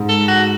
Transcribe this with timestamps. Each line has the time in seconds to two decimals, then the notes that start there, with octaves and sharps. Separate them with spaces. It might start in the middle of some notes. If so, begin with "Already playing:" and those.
Already playing: G#2 G#3
0.09 A4
0.28 F#4